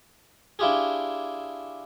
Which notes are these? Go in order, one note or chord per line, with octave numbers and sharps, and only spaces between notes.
D4 E4 F4 G4 G#4